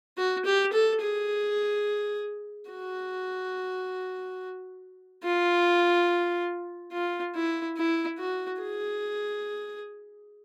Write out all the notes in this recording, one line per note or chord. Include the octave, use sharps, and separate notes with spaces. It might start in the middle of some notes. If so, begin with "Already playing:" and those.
F#4
G4
A4
G#4
F#4
F4
F4
E4
E4
F#4
G#4